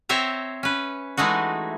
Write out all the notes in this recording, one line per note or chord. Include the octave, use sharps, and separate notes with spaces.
C4 C5 C#5 E5 A#5
C#4 B4
E3 G#3 A3 D#4 F#4